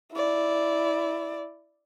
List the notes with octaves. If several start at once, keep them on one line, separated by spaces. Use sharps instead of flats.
E4 D5